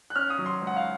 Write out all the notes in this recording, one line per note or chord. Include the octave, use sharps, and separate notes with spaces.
F#6
C#4 F6
D#6
F#3
C6
C#2
F#5
F5